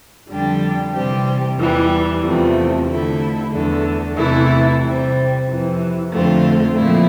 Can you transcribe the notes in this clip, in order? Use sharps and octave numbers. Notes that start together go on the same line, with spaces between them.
F2 D3 G3 D4 G4
C3 E3 G3 C4 G4
E2 E3 G3
E2 C3 F3 A3
D3 A3 E4 A4
E2 D3 A3
E2 C3 E3 A3 E4
C3 G3 C4
F2 C3 E3
F2 D3 A3 C4 F4
A#2 F3 A3 C4 E4